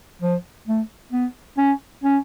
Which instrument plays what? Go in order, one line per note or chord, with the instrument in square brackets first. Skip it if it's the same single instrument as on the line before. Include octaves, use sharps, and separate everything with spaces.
[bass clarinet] F3
A3
B3
C#4
C#4